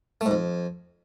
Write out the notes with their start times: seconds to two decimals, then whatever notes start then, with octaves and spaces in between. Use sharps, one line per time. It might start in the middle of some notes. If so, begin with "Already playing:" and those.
0.21 A3
0.26 G#2
0.31 F2